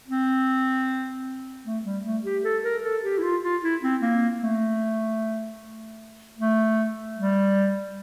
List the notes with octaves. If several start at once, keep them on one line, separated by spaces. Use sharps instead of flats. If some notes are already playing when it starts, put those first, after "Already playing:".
C4
A3
G3
A3
G4
A4
A#4
A4
G4
E4
F4
F4
E4
C4
A#3
A3
A3
G3